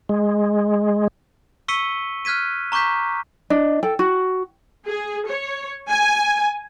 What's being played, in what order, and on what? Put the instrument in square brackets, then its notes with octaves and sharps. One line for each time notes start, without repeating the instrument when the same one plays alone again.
[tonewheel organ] G#3
[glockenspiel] C#6 E6 B6 C#7 D#7 G7
F6 F#6 G#6 B6 D#7
A#5 C#6 D6 G6 B6
[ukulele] D4 D#5
A4 G5
F#4
[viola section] G#4
C#5
G#5